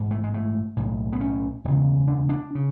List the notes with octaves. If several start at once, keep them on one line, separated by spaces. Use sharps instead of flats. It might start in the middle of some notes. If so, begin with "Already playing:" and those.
Already playing: A1 G#2
A3
G#3
A3
B1 A2
B3
C#4
E1 D2 C#3
D4
D4
C#3